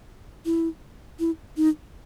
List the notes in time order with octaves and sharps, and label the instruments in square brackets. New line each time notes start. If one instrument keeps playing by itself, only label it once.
[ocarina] E4
E4
D#4